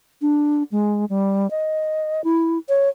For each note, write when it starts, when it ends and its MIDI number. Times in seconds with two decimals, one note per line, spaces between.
0.22 0.63 62
0.72 1.05 56
1.10 1.50 55
1.51 2.23 75
2.24 2.58 64
2.69 2.89 73